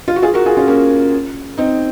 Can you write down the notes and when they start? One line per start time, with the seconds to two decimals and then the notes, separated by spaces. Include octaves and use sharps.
0.08 F4
0.16 F#4
0.22 F4 G#4
0.34 F#4 A#4
0.46 F4 G#4
0.57 C#4 F4
0.67 A#3 C#4
1.58 C4 D#4